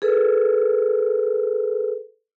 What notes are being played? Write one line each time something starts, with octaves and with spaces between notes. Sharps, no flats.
G#4 A4 B4